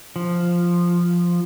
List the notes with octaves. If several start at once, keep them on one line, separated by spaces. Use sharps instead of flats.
F3